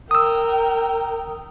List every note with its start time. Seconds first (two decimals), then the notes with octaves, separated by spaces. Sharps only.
0.11 A#4 G5 D#6 E6